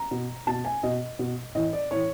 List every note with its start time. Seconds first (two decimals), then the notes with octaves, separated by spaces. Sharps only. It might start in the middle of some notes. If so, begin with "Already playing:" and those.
Already playing: A#5
0.11 B2
0.47 B2 A5
0.65 G#5
0.83 B2 D#5
1.19 B2
1.55 A2 E3 D#5
1.73 D5
1.91 A2 E3 C#5